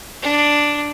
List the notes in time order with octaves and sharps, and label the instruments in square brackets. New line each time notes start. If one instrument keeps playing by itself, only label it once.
[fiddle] D4